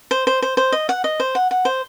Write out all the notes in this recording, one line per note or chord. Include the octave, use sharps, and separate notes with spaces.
C5
C5
C5
C5
D#5
F#5
D#5
C5
F#5
F#5
C5